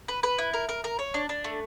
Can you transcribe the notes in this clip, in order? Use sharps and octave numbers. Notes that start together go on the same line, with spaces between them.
B4
B4
E4
A#4
A#4
A#4
C#5
D4
D4
A3